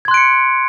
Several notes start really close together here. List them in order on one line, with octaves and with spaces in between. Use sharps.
G#6 C6 F#6 D7 C#7